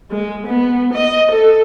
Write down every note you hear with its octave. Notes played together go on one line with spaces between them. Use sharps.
G#3
B3
D#5
A4